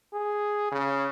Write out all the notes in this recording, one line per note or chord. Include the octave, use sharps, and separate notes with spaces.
G#4
C#3